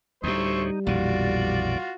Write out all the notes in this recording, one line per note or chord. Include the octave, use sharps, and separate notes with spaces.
D2 A2 G3 D#4 C5 E5 C#6
A#1 F2 B2 E3 F4 F#4 D5